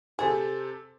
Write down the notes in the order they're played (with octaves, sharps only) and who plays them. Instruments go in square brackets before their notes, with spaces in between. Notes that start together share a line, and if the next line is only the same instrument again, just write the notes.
[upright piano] C3 A4 C5 [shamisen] G#4